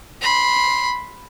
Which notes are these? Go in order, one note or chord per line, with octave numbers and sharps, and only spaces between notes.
B5 C6